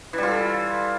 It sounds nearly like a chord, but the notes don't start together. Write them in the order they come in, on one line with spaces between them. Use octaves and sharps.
E3 G3 F4 A4